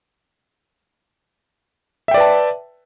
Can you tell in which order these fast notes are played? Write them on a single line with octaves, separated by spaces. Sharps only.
E5 G5 D5 B4 A5